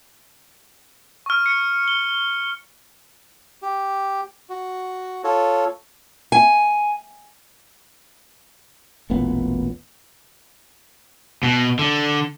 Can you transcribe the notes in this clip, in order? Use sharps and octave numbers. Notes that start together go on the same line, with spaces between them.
C#6 F6
C#7
G7
G4
F#4
F4 A4 C#5
G#5
E1 A1 A#2 B3
B2
D3